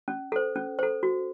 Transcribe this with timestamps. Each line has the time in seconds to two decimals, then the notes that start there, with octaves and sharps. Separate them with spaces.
0.08 C#4
0.32 A4 C5
0.56 C#4
0.79 A4 C5
1.03 F#4